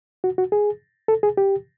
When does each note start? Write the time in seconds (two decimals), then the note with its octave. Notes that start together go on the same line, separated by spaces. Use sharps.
0.24 F#4
0.38 F#4
0.52 G#4
1.08 A4
1.23 G#4
1.37 G4